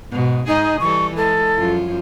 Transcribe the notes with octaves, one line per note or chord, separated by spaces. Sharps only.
G#2 B2
G#2 D#4 G#4 D#5
E3 G3 A4 C#6
G#3 E4 A4
F#2 F3 F4